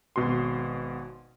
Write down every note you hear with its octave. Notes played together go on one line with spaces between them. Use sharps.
G#1 B2 F#4 C6